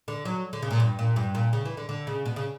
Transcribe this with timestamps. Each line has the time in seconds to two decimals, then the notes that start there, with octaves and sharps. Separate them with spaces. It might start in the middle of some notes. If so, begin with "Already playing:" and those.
0.08 D3
0.25 F#3
0.53 D3
0.62 C#3
0.71 A#2
0.80 G2
0.99 A#2
1.16 G2
1.35 A#2
1.53 C#3
1.65 E3
1.77 D3
1.89 D3
2.07 C#3
2.26 B2
2.36 C#3